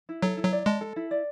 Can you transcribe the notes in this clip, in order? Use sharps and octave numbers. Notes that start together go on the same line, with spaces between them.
E4
F#3 A4
E4
F#3
D5
G#3 A5
A4
E4
D5